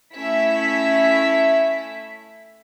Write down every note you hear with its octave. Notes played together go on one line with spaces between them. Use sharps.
A3 C#4 E4 E5 B6